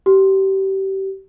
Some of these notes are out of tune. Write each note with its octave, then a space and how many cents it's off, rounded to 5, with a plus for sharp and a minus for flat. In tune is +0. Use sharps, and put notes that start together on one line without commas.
G4 -25